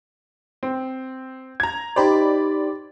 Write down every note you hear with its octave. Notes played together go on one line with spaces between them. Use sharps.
C4
A#5 G#6
D#4 G4 C5 D5 B5